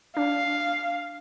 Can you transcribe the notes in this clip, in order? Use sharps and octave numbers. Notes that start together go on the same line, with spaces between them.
D4 F5